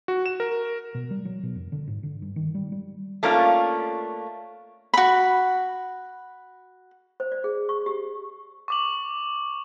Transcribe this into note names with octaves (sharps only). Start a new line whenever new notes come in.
F#4
E7
A#4
B2
G3
F#3
B2
F2
D3
G#2
D3
G2
D#3
G3
G3
A3 A#3 C#4 D4 F4
F#4 B5
C5
D5
G#4
C#6
G4
C#6 D6 F#7